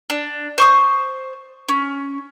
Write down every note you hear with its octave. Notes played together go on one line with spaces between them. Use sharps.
D4
C5 C#6 D#6
C#4